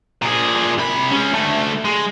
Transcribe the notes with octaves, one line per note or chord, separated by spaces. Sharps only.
A#2 G#4
C3 B5
G#3 C#4
D2 A3
G#3